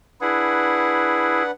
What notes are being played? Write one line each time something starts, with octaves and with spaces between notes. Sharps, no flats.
D4 E4 G#4 B4 F#5